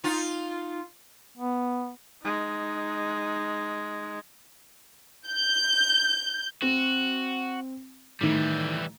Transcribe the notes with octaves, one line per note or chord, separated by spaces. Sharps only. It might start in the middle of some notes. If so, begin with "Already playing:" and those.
D#4 F4
B3
G#3 D#4
G6
C4 F#4
A2 D#3 E3 G3